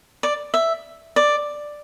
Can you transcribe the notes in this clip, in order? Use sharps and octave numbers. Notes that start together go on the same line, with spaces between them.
D5
E5
D5